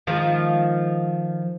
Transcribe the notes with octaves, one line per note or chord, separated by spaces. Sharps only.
D#3 F3 G#3